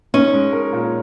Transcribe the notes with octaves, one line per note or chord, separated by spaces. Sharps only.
C#4 D#4
G#3
A#4
A#2